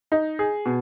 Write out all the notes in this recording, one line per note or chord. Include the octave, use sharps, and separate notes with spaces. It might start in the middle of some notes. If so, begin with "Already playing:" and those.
D#4
G#4
B2